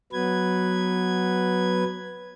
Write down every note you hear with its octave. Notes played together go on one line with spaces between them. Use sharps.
F#3 B3 B4 G#6